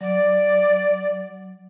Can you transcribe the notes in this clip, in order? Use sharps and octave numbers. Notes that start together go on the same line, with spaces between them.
F#3 D5